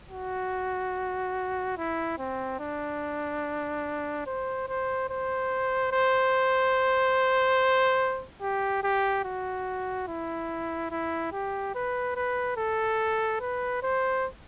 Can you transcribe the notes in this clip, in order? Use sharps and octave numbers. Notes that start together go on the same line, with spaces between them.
F#4
E4
C4
D4
C5
C5
C5
C5
G4
G4
F#4
E4
E4
G4
B4
B4
A4
B4
C5